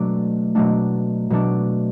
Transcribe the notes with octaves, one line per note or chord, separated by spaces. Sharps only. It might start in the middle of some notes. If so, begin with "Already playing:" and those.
Already playing: B2 F#3 A3 D4
B2 F#3 A3 D4
B2 F#3 A3 D4